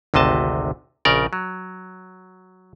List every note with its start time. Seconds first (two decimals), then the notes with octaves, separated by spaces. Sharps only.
0.14 G#1 D2 C3 D#5 A5
1.05 A#1 C#3 A#4 D5
1.33 F#3